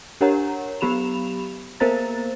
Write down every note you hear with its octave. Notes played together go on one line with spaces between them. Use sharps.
D4 G4 A#4 C#5 F#5 A#5
F#3 B3 G4 B5 E7 F7
A#3 B3 A#4 C5 A#5 A6